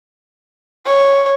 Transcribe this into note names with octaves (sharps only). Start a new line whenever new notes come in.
C#5